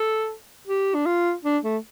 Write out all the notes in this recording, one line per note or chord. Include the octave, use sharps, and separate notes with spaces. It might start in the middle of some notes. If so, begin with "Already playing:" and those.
Already playing: A4
G4
D4
F4
D4
A3